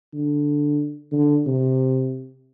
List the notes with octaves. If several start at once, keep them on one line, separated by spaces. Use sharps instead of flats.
D3
D3
C3